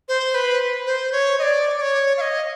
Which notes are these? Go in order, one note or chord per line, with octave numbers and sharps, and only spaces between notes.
C5
B4
C5
C#5
D#5
D5
D5
C#5
F5
D#5